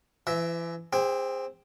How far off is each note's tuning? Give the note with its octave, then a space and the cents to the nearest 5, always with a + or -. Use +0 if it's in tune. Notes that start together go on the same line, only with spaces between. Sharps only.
E3 +35 E5 -10
C4 +0 G#4 -35